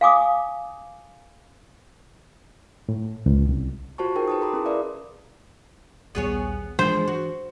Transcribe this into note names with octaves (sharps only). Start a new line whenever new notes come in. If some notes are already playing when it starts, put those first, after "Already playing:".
F5 G#5 D6 D#6
A2
C#2
C2
F4 F#4 C5 A5 C#6
D#4 F#4 G#4 A#4 G5
B4 A5 D#6
A4 A#4 A#5 C6 D6 D#6
C#4 E4 G#4
G#4 A#4 B4 D5 E5 F5
A#1 D#2 G3 B3 G#4 C#5
E3 F3 G#3 D4 C5
F#4